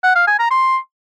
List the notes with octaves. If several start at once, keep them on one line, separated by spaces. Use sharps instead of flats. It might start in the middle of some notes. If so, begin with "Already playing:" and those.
F#5
F5
G#5
A#5
C6